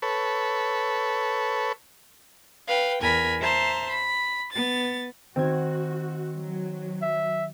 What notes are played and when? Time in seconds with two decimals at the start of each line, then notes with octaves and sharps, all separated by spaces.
0.02 A4 B4 C#5
2.66 B4 F5 G5
3.01 E2 A#4 G#5 B5
3.39 C5 E5 A5 A#5 C6
3.90 B5
4.51 B3 A6
5.36 D#3 C4 F#4 G#6
6.37 F#3
7.02 E5